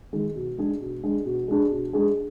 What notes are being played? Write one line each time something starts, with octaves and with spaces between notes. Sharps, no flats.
D#3 G#3
B2
G#3 D4 G#4
B2
G#3 D4 G#4
B2
G#3 D4 G#4
B2
G#3 D4 G#4